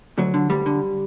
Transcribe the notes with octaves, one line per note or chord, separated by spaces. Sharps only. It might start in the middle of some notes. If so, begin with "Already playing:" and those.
D2 F#3
D3
D2 G3
D3